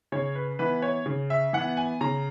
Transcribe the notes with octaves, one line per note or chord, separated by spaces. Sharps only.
C#3 C#5
B4
E3 B3 B4
C#5
C#3
E5
E3 B3 F#5
G#5
C#3 A#5